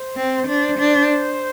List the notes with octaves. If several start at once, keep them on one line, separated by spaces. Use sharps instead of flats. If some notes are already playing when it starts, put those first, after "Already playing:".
Already playing: C5
C4
D4 C5
D4